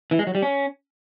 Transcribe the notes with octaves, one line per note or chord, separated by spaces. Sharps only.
E3
G#3
F#3
G3
C#4